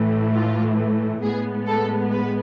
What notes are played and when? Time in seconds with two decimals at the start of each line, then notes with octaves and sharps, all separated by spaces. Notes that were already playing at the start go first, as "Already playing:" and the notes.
Already playing: A2 E3 A3
0.32 F4
1.22 A2 G#3 B3 G#4
1.67 A4
2.11 B4